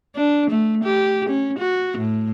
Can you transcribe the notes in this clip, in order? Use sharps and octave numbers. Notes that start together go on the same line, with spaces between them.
D4
A3
G4
C#4
F#4
A2